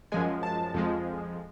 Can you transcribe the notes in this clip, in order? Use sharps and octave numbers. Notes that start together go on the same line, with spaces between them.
F#2 F3 G#3 G#5
A5
F2 F3 G#3